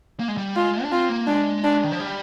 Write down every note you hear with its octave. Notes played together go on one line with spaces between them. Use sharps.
A#3
G#3
G3
G#3 F4
D4
C4 F4
A#3
G#3 D4
D4
D#3
F3
G3